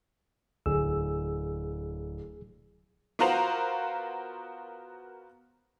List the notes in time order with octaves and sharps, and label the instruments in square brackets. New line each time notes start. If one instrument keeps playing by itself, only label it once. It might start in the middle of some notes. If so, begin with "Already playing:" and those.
[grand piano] D1 [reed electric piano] G#4 E6
[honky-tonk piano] B3 F4 F#4 A#4 C5 F7